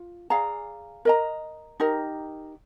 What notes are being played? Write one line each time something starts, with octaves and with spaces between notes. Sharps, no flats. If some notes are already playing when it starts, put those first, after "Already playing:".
Already playing: F4
G#4 D5 F5 A#5
A#4 D#5 A#5
D#4 G4 A#4